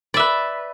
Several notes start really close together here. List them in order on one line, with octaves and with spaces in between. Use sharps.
D5 E5 B4